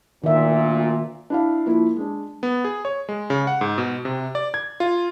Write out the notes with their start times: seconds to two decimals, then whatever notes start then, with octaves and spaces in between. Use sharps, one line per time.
0.24 D2 A#2 D#3 E5
1.30 D4 E4 F5
1.66 F3 A#3 E4 F4
1.96 G#3 D4
2.43 B3
2.65 G#4
2.85 C#5
3.09 G#3
3.30 C#3
3.47 F#5
3.61 G#2
3.78 B2
4.05 C3
4.35 D5
4.54 G#6
4.80 F4